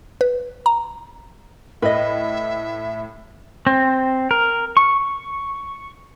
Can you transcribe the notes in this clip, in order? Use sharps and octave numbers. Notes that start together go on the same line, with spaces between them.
B4
A#5
A2 B4 D#5 E5
C4
A#4
C#6